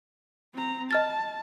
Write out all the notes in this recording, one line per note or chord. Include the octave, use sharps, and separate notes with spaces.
C4 A#5
D#5 A5 F6 A6